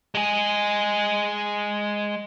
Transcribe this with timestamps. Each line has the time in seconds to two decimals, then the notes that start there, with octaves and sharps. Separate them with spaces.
0.15 G#3 G#4